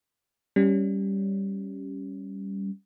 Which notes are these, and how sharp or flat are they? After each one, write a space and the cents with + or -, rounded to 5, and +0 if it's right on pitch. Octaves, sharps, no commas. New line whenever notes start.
G3 +0 C#4 +0